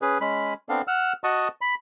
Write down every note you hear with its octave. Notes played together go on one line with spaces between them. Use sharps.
C#4 G#4 B4
G#3 C#4 B5
B3 C4 D4 A4 F5
F#5 E6 F6
F#4 D#5 F#5 A5 C#6 D#6
B5